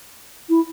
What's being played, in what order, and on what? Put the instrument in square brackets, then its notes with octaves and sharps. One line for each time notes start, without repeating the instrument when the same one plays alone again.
[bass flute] E4